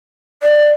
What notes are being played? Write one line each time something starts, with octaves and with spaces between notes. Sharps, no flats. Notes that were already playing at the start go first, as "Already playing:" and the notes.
D5